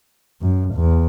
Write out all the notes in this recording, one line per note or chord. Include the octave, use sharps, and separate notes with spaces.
F#2
E2